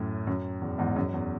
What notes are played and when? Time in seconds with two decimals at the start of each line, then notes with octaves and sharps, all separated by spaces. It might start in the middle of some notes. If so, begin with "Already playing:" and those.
Already playing: F#2 A2
0.27 F#2
0.61 E2
0.78 E2 G#2
0.96 F#2
1.14 E2